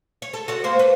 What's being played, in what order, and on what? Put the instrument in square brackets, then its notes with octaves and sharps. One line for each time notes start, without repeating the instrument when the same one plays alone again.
[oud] C#5
A4
F#4 A4 C#5
A#3 C5
B4